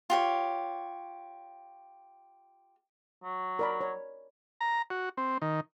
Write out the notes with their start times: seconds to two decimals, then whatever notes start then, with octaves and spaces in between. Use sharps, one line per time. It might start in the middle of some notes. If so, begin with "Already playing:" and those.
0.10 F4 G4 C#5
3.24 F#3
3.59 A#4 D5 B5
3.81 C#5
4.61 A#5
4.90 F#4
5.17 C4
5.42 D#3